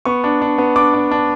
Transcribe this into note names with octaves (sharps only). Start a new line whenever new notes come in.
B3 C#6
D4
D4
B3
D4 D6
D4
D4